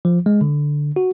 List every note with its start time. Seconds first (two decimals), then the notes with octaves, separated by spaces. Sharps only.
0.05 F3
0.26 G#3
0.41 D3
0.96 F#4